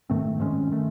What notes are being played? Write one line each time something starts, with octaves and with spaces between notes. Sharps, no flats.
G#2 D#3 A3 C4
G#2 D#3 G#3 C#4
D#3 A3